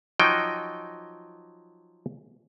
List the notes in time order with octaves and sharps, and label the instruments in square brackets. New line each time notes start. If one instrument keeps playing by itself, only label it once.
[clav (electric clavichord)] F3 F#3 D#4 D#5 G5